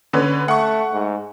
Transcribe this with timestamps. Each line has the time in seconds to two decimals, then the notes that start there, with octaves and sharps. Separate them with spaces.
0.13 D3 C#4 B4
0.48 A3 F#5 C#6
0.93 G#2